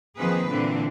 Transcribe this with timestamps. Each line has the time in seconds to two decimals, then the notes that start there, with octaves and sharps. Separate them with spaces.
0.17 D#3 F3 A#3 C4 G#4 B4
0.50 A#2 D3 E3 C4 D4